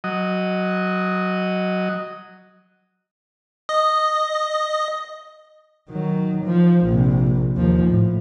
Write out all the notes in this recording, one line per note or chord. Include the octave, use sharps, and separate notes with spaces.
F#3 D#5
D#5
D#3 F#3
F3
A#1 C3
D#2 F3
A2